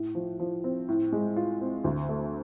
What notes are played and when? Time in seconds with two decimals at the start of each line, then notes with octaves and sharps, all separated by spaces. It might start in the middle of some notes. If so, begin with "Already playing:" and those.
Already playing: A2
0.15 F3
0.40 F3
0.64 C4
0.88 A2
1.12 G#3
1.36 F4
1.61 C4
1.84 D2
2.09 A3